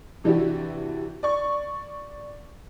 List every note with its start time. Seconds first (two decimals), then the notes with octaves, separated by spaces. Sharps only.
0.24 C3 E3 D4 E4 F#4 G4
1.23 D5 C#6